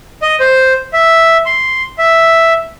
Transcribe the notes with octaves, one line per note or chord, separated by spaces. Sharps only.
D#5
C5
E5
C6
E5